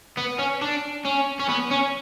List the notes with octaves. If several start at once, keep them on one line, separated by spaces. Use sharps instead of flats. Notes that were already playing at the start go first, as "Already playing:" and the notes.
B3
C#4
D4
C#4
C#4
B3
C#4